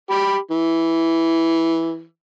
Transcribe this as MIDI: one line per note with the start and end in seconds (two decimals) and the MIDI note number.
0.11 0.36 67
0.11 0.36 83
0.51 2.04 52